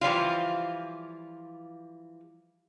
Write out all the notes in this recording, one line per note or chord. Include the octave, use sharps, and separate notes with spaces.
E3 F3 G3 F4